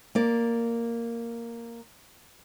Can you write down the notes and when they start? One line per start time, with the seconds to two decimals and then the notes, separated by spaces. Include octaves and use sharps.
0.15 A#3 D5